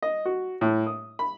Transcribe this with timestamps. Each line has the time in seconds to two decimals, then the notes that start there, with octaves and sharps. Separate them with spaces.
0.02 D#5
0.26 F#4
0.61 A2
0.86 D#6
1.19 B5